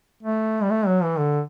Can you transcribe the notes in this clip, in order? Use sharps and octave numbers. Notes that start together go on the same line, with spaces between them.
A3
G3
A3
F#3
E3
D3